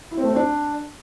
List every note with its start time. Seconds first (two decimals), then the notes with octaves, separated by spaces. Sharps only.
0.11 E4
0.18 C4
0.24 A3
0.30 C4
0.36 D4